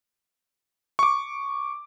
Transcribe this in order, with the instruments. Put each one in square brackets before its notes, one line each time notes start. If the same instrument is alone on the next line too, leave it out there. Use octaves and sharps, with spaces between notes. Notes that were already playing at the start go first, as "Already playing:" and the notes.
[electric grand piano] C#6 D6